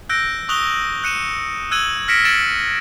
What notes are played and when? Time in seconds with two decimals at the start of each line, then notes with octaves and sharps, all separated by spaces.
0.09 E6 F#6 G6 A#6 D7
0.49 C#6 D#6 F#6 F7 G7
1.04 F#6 C#7 D#7 E7
1.71 E6 F#6 G#6 D#7 F#7
2.08 F6 A#6 B6 C#7 D7 E7
2.25 G#6 A6 C#7 D7 E7 F#7